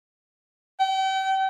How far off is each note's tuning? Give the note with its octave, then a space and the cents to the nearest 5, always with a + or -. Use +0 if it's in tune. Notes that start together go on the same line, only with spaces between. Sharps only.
G5 -35